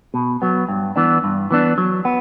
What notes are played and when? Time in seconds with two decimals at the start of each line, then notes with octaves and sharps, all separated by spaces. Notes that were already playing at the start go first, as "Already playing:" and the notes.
0.14 B2
0.42 F#3 B3
0.69 G2
0.96 E3 B3 D4
1.24 G2
1.51 E3 B3 D4
1.78 F#3
2.05 B3